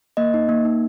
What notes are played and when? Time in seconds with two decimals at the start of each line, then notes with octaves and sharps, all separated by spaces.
0.17 A#3 D#5
0.34 D#4
0.49 A#3
0.65 D#4